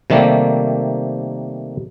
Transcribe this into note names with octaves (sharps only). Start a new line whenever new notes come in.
C3 D#3 G3 A3 A#3